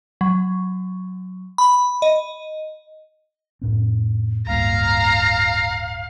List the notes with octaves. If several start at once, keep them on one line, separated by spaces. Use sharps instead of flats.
F#3
B5
D#5
F2 A2 C4
D1 G2 A#3 F5 A#5